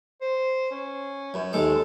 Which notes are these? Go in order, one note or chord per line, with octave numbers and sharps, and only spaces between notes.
C5
C#4
F#2
D#2 G#3 A4 D6